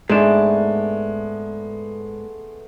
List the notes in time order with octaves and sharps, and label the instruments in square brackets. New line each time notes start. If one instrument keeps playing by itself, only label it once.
[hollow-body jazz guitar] G#2 D4 [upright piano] G#3 [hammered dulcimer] A3 B3